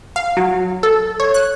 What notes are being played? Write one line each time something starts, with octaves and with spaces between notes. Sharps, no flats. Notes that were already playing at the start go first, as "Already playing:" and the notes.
F5
F#3
A4
C#5
F#6